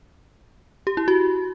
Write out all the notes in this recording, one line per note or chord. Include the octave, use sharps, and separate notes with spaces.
G4
E4
F#4